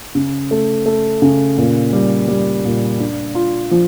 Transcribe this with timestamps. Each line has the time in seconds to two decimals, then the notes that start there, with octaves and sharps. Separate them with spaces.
0.15 C#3
0.51 A3
0.86 A3
1.22 C#3
1.58 A#2
1.93 G3
2.28 G3
2.65 A#2
3.00 D4
3.35 F4
3.71 F3